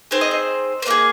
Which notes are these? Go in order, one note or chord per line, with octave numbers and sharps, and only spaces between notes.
C4 D#4 G#4 C5
D#5
C5
C5
A#3 D#4 G#4 D#5